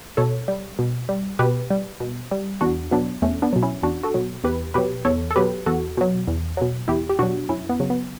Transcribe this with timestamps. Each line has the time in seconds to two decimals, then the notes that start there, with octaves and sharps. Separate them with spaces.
0.17 B2 A4 C#5
0.48 G3
0.79 B2
1.09 G3
1.39 B2 G4 B4
1.70 G3
2.00 B2
2.31 G3
2.61 E2 D4 F#4
2.91 B2 F#3 B3 D4
3.22 E2 A3 C#4
3.42 B3 D4
3.53 B2 F#3
3.63 C#4 E4
3.83 E2 D4 F#4
4.03 F#4 A4
4.14 B2 F#3
4.44 E2 G4 B4
4.74 B2 F#3 G4 B4
5.05 E2 A4 C#5
5.31 A4
5.36 B2 F#3 G4 B4
5.66 E2 F#4 A4
5.97 B2 F#3
6.27 E2
6.57 B2 F#3
6.88 E2 E4 G4
7.09 G4
7.19 B2 F#3 D4 F#4
7.49 F#2 C#4 E4
7.69 B3
7.80 C#3 F#3
7.90 B3